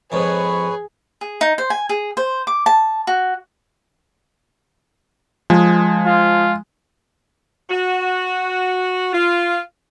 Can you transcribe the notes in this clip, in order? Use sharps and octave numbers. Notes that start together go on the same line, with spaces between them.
F2 G#2 G#4 B4 C#5
G#4
D#4
C5
G#5
G#4
C5
D6
A5
F#4
F3 G#3
F4
F#4
F4